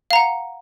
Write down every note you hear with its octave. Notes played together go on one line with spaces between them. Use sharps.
F5 F#5 A#5